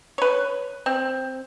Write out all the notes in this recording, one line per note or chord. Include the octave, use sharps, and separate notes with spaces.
B4 C#5
C4